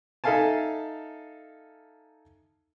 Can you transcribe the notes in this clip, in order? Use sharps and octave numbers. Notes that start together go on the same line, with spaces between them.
D#4 A4 E5 F5 G#5 A5